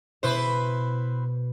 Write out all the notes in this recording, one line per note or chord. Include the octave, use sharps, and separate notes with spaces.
B2 E4 B4 C5